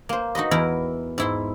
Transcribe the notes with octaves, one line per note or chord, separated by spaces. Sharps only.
A#3 C5
D#4 F#4 B4 D#5
E2 E4 A#4
G#2 E4 C6